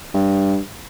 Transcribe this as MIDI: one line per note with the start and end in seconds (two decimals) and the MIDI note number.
0.14 0.58 43